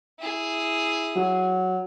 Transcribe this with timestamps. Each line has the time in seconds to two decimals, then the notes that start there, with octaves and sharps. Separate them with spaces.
0.19 E4 G#4
1.16 F#3